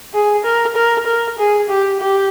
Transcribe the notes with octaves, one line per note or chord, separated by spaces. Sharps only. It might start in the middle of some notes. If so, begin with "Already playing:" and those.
G#4
A#4
A#4
A#4
G#4
G4
G4